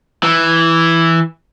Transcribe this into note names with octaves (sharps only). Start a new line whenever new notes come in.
E3